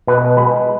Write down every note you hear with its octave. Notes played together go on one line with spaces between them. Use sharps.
B2 B4
G#3 B4